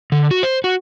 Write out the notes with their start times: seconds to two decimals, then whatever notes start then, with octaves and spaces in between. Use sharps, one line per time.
0.12 D3
0.31 F#4
0.43 C5
0.64 F#4